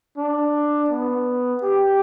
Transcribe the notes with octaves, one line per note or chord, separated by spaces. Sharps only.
D4
B3
G4